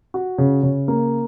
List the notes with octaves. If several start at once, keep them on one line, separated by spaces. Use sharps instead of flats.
F#4
C#3
C#3
A#3